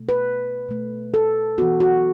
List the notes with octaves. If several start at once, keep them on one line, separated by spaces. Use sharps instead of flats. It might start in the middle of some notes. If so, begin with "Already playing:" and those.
Already playing: B2 A3
B4
B2 A3
A4
E3 B3 F#4
F#4